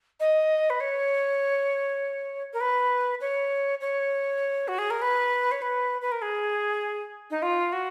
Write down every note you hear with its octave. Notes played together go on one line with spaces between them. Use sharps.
D#5
B4
C#5
A#4
B4
C#5
C#5
F#4
G#4
A#4
B4
C#5
B4
B4
A#4
G#4
D#4
F4
F#4